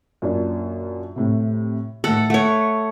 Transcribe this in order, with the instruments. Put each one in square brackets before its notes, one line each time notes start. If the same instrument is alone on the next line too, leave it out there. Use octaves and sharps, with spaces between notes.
[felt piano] F#2 A#2 D4
A2 C3
[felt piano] A2 D#3 A3 [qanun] A4 F#5
[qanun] A3 C#5 [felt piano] F#5